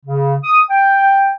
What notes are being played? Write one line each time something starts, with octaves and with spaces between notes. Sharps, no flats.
C#3
D#6
G5